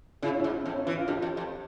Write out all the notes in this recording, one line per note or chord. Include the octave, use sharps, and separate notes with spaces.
C#3 E4
C#4
G#2 E4
F2 C4
C#4
E3 E4
F4
F2 G4
F2
F2